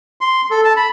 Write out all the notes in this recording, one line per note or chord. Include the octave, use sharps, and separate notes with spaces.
C6
A4
A5
B5